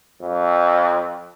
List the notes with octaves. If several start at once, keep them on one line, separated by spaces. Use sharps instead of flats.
F2